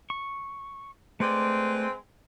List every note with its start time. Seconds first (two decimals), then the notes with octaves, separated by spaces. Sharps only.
0.10 C#6
1.20 G#3 A3 C4 B4 D5